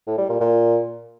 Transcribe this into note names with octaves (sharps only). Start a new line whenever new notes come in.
A2
G3
A#2
A#2